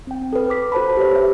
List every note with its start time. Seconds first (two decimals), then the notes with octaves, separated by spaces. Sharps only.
0.07 C4 G5
0.33 A4 B4
0.50 D6 B6
0.72 F#4 C5 A5 B5
0.97 G4 B4 C#5
1.16 E5